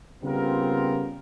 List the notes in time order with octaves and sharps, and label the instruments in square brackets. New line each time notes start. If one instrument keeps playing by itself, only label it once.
[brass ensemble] C#3 G3 B3 C4 F4 A#4